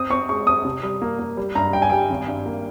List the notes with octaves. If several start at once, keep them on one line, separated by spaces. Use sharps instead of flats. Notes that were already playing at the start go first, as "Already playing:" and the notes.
Already playing: C4 D#6
C4 C#6
G#3 C#6
C4 D#6
C3
G3
A#3
A#3
G3
G2 A#5
G3 G5
G#5
G3 G5
G#1
G2
A#3